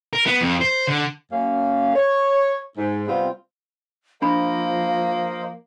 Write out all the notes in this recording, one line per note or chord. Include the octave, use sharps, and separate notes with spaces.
A#4
B3
F2
C5
D3
F#2 A#3 C#4 F5
C#5
G#2
C3 G3 B3 C4 F4
F3 A#3 D4 C5 D#5 F5 B5